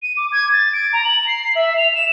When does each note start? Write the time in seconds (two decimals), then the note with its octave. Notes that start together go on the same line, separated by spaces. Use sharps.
0.03 D#7
0.17 D6
0.32 G#6
0.53 A6
0.73 D7
0.93 A#5
1.05 F#7
1.27 C7
1.55 E5
1.77 F7
1.95 E7